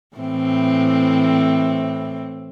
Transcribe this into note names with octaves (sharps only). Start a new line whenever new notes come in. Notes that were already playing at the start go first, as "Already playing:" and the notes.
A2 E3 C4